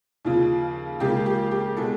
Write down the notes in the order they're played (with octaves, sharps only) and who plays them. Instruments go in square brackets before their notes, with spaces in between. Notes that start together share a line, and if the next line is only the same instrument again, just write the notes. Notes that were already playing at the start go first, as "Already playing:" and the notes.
[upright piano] D#2 C#3 F3 F4
C#2 C#3 F3 A#3 G4
G4
G4
B2 G#3 A4